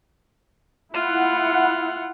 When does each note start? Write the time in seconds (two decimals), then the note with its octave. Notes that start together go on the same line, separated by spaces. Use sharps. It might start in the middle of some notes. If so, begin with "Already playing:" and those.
0.94 E4 F4 F#5